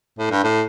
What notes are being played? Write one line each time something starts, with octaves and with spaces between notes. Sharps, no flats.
A2
G2
A2